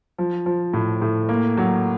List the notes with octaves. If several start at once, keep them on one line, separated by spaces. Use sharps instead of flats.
F3
F3
A2
A2
A#3
F#3